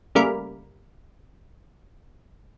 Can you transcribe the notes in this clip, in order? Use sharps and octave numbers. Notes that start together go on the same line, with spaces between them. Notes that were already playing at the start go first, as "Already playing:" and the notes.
C#3 G3 A3 A#3 A#4 B5